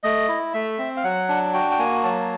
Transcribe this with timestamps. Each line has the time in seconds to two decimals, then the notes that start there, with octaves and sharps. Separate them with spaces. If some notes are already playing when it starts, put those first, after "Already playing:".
0.03 A3 D#5
0.29 E4
0.54 A3 E5
0.78 C4
0.97 F5
1.04 F#3 F#5
1.29 D4
1.54 F#4 G5
1.71 G5
1.79 A#3 G#5
2.04 F#3 A5